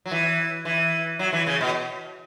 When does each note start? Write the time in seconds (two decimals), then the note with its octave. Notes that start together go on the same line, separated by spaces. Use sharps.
0.06 F#3
0.11 E3
0.65 E3
1.19 F#3
1.33 E3
1.47 C#3
1.61 B2